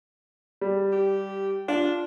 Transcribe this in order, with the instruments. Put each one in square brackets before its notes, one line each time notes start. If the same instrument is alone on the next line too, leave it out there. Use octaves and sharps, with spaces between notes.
[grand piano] G3
[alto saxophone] G4
[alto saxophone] D4 [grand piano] F4